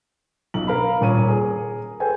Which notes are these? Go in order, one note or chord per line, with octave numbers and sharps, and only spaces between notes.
B1 F#7
A#4 F5 B5
D#1 A#2 C#5 D#7
G#4 A#4
G#4 A4 B4 C5 G5 G#5